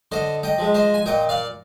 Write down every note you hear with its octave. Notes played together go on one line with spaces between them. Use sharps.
D3 C5 D#5
D#5 G5
F3 G#3
C5 D#5
G#5
A#2 D#5 G5
D5 F5